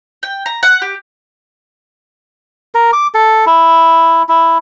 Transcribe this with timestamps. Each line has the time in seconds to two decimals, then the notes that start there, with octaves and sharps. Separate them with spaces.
0.23 G5
0.46 A#5
0.63 F#5
0.82 G4
2.75 A#4
2.93 D6
3.14 A4
3.46 E4
4.29 E4